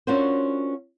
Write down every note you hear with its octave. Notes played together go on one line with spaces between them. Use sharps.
C#4 D4 F4 F#4 A#4 C5